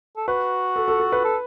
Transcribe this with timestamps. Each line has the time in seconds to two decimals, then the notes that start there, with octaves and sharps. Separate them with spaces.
0.17 A4
0.28 F#4 B4
0.76 A4
0.88 A4
1.00 A4
1.12 B4
1.24 A4